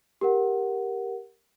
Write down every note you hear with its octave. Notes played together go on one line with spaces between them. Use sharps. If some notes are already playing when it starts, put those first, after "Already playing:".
G4 A#4 F#5